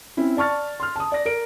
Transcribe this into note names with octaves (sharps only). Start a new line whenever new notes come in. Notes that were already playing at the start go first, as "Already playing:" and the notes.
C4 C#4 E4
D5 A5 C#6 F6 A6
C6 F6
A5 D#6
D5 A#6
A#4 D7